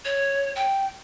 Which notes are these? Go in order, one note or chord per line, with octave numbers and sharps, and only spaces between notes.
C#5
G5